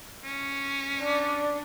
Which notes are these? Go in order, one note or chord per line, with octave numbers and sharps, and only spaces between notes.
C#4
D4 D5